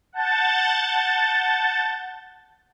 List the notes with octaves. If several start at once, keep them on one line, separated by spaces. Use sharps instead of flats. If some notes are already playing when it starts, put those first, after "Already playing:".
F#5 A5 G6 A6